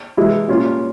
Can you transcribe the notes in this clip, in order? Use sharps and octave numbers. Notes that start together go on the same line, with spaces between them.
E3 G#3 E4
A#2 G3 C#4 F4